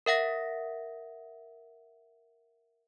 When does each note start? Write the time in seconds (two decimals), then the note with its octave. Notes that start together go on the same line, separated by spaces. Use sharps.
0.06 A#4 E5 F#5 A#6